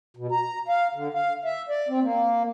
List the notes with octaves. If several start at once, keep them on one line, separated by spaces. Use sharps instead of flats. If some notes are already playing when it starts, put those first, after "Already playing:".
B2
A#5
F5
D3
F5
E5
D5
C4
A#3